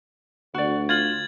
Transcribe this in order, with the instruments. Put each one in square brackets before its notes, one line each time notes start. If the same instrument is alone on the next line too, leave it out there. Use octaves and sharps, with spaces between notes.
[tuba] D2 [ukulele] F#4 D5
[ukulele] F4 [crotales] G#6 A6 F#7